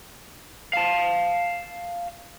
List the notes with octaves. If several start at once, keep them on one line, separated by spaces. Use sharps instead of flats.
F5 A5